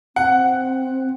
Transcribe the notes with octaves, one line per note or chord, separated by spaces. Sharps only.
C4 F#5